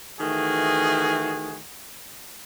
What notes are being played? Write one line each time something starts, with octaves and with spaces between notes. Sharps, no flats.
D#3 E3 A3 F#4 G#4